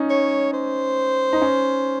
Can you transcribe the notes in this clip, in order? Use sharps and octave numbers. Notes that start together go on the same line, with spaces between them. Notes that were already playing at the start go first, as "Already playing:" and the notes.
Already playing: C#4 D#4
C#5
C5
D#4
C#4